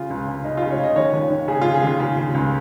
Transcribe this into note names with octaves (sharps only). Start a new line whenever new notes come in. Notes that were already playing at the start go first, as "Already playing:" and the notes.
Already playing: C#3 F4
C#2
C#3
C#3 D#4
C#3 F4
C#5
C#3 D#5
D#2 C#5
D#2
D#2
C#3 G#4
C#3 F4
G#4
D#2 F4
C#3
C#3
C#2